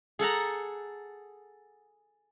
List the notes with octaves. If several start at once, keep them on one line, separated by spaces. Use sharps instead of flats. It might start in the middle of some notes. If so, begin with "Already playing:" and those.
G#4 A4 F#5 A#5